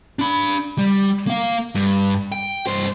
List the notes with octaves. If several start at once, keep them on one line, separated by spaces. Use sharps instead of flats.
D4 B5
G3
A#3 F5
G2
G5
G2 C5